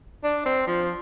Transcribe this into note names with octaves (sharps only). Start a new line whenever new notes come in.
D4
C4
F3